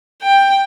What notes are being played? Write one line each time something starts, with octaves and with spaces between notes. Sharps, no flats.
G5